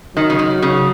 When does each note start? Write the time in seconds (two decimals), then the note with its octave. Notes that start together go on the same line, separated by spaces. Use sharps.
0.16 D#3 F#3
0.30 C#3
0.39 D#3
0.62 C#3